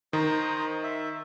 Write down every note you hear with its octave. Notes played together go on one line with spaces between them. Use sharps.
D#3 C5 A#5 D#6
E5